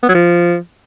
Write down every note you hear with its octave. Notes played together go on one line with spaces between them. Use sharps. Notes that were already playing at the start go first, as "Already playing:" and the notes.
B3
F#3
F3